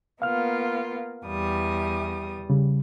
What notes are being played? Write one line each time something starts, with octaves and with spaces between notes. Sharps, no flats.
A#3 B3 F4 F5 F6
E2 G3 D#6
C#3 G3